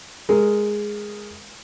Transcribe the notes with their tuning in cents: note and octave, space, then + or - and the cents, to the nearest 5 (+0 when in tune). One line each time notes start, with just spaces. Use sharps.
G#3 +0 A#4 +0